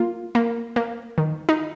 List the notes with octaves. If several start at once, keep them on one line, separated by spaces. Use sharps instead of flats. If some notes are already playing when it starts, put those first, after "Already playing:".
Already playing: A#3 F4
A#3
A#3
D#3
D#4